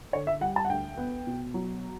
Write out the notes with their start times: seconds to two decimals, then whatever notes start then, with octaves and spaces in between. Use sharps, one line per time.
0.13 D3 C#5
0.27 E5
0.41 G3 F#5
0.56 A5
0.65 F#5
0.70 D2 G5
0.97 B3
1.27 B2
1.54 F#3